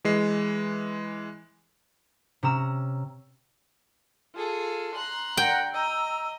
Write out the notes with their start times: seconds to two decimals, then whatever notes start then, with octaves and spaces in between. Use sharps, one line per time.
0.05 E3 G#3 C7
2.43 C3 C#4 A#5 E6
4.35 F4 G#4 A4
4.96 A#5 C6 F#6
5.37 A#4 F#5 G5
5.73 D#5 A#5 E6